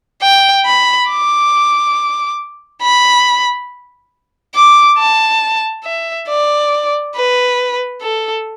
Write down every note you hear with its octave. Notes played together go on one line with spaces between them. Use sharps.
G5
B5
D6
B5
D6
A5
E5
D5
B4
A4